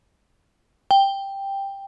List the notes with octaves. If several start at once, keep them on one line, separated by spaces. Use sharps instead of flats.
G5